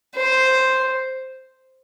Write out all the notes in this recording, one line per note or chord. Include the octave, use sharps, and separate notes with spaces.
C5